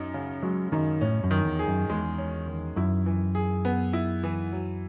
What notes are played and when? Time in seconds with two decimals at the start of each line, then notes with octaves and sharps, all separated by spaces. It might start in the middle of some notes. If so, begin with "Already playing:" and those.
Already playing: F#2 D#4
0.14 C#3
0.43 F#3 G#3
0.72 F#2 D#3
1.01 A2 C#4
1.24 F#2
1.31 D#3
1.45 E2
1.59 G#4
1.68 F#2
1.89 E2 G#3
2.18 C#4
2.47 D#3
2.76 F#2 E4
3.06 E3
3.35 G#4
3.65 B3
3.93 E4
4.23 E3
4.52 F#3